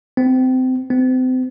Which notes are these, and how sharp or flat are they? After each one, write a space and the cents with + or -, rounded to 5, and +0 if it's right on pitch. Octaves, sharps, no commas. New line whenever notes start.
C4 -25
C4 -35